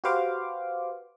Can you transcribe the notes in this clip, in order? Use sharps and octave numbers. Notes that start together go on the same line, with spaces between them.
F#4 G4 B4 C5 F5 D6